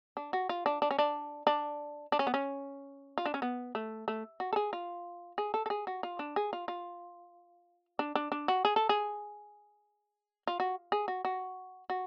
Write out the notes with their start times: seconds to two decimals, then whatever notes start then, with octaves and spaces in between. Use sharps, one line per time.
0.17 D4
0.33 F#4
0.49 F4
0.66 D4
0.82 D4
0.91 C#4
0.99 D4
1.47 D4
2.12 D4
2.19 C#4
2.27 B3
2.34 C#4
3.18 F4
3.26 D4
3.34 C#4
3.42 B3
3.75 A3
4.08 A3
4.40 F#4
4.53 A4
4.56 G#4
4.73 F4
5.38 G#4
5.54 A4
5.66 A4
5.70 G#4
5.87 F#4
6.03 F4
6.19 D4
6.36 G#4
6.53 F4
6.68 F4
7.99 D4
8.15 D4
8.32 D4
8.48 F#4
8.65 G#4
8.76 A4
8.89 G#4
10.47 F4
10.60 F#4
10.92 G#4
11.08 F#4
11.25 F#4
11.90 F#4